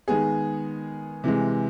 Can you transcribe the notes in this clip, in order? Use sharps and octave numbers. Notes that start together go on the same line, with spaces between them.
D#3 G#3 B3 G#4
C3 E3 G#3